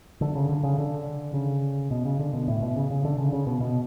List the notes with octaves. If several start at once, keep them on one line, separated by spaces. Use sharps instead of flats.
D3
C#3
D3
C#3
D3
C#3
B2
C#3
D3
B2
A2
B2
C#3
C#3
D3
C#3
C#3
B2
B2